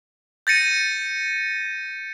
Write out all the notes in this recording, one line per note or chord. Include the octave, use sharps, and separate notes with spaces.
G6 A6 A#6 C#7 D#7